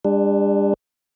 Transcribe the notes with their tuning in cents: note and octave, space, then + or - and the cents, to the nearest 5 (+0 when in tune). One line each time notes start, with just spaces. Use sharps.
G3 +45 D4 +5